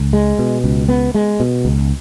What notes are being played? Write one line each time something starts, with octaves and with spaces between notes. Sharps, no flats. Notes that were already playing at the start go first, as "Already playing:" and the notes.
Already playing: C#2
G#3
B2
C#2
B3
G#3
B2
C#2